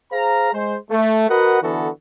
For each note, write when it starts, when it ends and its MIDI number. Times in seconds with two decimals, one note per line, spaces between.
0.12 0.52 68
0.12 0.52 72
0.12 0.52 77
0.12 0.52 82
0.53 0.77 56
0.53 0.77 72
0.90 1.26 57
1.29 1.62 66
1.29 1.62 70
1.29 1.62 71
1.29 1.62 75
1.29 1.62 78
1.62 1.89 50
1.62 1.89 52
1.62 1.89 59
1.62 1.89 66
1.62 1.89 69